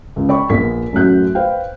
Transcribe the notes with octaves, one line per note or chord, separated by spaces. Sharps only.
C#2
D5 G5 B5 C#6
A#1 B3 A#4 B6
A1 F#2 A3 F#4 F#6 G6
B4 C5 F5 G5